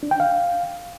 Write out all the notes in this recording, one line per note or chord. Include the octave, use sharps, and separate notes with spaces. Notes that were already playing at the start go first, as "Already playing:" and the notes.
D4
G5
F5